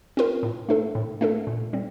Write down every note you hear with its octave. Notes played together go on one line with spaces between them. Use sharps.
C4 F4 A#4
A2
A3 D4 A4
A2
A3 D4 A4
A#2
G3 C4